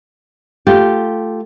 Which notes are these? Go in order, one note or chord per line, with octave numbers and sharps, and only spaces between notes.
A3 F4 G4